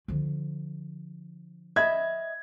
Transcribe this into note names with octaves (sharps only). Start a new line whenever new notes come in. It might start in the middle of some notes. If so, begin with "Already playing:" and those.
D3 F3
D#5 E5 B5 G#6